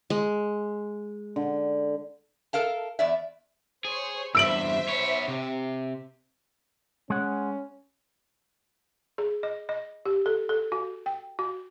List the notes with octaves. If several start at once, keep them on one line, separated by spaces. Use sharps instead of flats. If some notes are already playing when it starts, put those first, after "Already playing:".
G#3
D3
A4 A#4 F5 A5
E2 D5 E5
G#4 C5 C#5
E2 G2 C5 E5 E6 D7 F#7
B3 C#5
C3
G#3 C#4 F#5
G#4
D#5
D#5
G4
A4
A4
F#4
G5
F#4